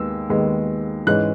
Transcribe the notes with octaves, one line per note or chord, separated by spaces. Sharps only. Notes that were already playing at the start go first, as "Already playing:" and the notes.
Already playing: D#2 D#3 G#3 B3 E6
D#2 D#3 G#3 B3
G#2 E3 G#3 C#4 F#6